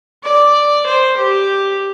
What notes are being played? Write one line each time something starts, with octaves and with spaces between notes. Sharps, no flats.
D5
C5
G4